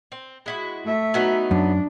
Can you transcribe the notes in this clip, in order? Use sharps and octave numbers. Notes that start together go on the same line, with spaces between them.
C4
G#3 E4 F#4
A3 E5
F#3 B3 D#4
F#2 D4